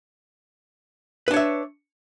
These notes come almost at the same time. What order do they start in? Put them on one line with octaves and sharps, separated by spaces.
B4 D4 C#5 E5